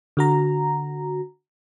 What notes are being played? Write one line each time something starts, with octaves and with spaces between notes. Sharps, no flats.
D3 F#4 A#5